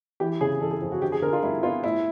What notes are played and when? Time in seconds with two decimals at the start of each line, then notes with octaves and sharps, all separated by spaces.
0.20 E3 G4
0.41 C#3 G#4
0.61 E3 A4
0.71 G#4
0.82 F2
0.92 F#4
1.02 D3 G4
1.12 G#4
1.22 D3 A#4
1.33 F4
1.43 G3 E4
1.63 B3 F4
1.84 A2 E4